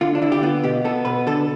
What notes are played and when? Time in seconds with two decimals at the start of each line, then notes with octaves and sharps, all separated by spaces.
0.01 D3 F4
0.15 D4
0.22 D3 E4
0.32 G4
0.43 B3 F4
0.63 B2 G4
0.84 B3 A4
1.05 B2 B4
1.27 D3 A4